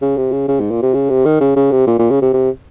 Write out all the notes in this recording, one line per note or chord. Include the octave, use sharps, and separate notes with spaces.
C#3
C3
C#3
C#3
G#2
A#2
C3
C#3
C3
D#3
C#3
C#3
C3
A#2
A#2
C#3
C3
C3